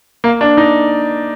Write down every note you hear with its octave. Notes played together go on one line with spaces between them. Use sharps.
A#3
D4
D#4